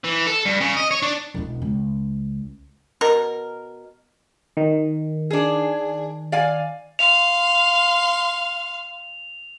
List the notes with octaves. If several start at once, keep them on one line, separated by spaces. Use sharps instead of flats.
E3
A4
G2
C#3
D#5
C#5
D4
E1 B2
C#2
B2 A#4
D#3
D4 G#4
D5 F5 G#5
F5 C6 F7